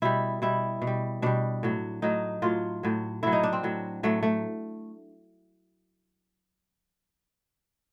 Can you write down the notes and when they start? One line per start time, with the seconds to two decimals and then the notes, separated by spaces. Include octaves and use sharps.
0.02 B2 G3 E4
0.42 B2 G3 E4
0.82 B2
0.87 G3
1.22 B2 G3 D4
1.63 A2 F#3
2.02 A2 F#3 D#4
2.42 A2 F#3 F4
2.83 A2 F#3
3.23 A2 F#3 E4
3.32 D#4
3.43 D4
3.53 C4
3.63 A2 F#3
4.03 A2 F#3 A3
4.23 A3